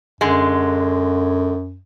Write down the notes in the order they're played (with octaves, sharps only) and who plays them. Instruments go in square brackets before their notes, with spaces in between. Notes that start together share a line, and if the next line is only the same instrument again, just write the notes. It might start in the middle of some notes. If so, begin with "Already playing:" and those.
[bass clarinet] F#2 [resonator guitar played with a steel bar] D3 G#3